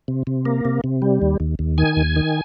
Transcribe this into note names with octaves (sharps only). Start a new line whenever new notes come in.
C3
C3
A#3
C3
C3
G3
D#2
D#2
D#2
D#3 G#5
D#2
D#3